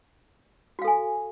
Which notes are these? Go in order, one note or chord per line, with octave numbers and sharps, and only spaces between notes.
F#4 A4 F5 G#5